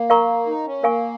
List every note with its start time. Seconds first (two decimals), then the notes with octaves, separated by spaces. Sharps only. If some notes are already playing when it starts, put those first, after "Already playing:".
Already playing: A#3
0.10 A#4 F5 A#5 C#6
0.46 D#4
0.65 C#4
0.83 A#3 A#4 F5 G#5 C#6